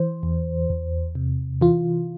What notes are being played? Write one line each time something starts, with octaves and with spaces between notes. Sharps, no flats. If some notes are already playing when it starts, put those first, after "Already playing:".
Already playing: E3 C5
E2
E2
C3
E3 F4